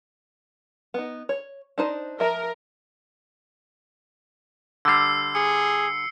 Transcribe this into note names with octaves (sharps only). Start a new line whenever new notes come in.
B3 D#4
C#5
D4 D#4 C5
F3 A#4 E5
D3 G3 E6 C7
G#4 C#7